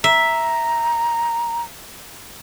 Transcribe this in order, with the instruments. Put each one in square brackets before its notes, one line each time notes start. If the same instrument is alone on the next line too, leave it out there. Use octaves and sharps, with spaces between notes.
[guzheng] E5 [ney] A#5